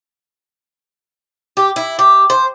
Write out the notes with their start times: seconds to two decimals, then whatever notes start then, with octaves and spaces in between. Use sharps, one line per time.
1.57 G4
1.76 E4
1.99 G4
2.30 C5